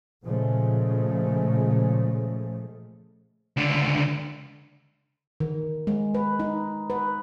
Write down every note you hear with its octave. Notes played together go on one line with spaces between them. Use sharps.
A#2 C#3 F3 G#3 A3
C#2 D3
D#3
G#3
B4
D#4
B4